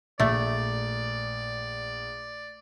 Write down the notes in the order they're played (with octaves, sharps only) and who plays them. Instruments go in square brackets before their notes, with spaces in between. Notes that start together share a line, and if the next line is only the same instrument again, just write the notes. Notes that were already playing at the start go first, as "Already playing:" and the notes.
[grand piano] A#1 [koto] A3 [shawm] D5